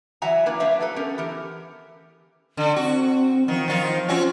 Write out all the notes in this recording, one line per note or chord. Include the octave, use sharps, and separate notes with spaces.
E3 F#3 E5 F#5 G#5 A#5
A#3 D4 E4 B4 D5
F#3 A3 D4 B4 E5 F5
F#3 A4 B4
A3 B3 C#4 G4 A#4
E3 G4 A#4
D3
C4 F#4
D#3 F3
D#3 F3 F4
C4 C#4 F4 F#4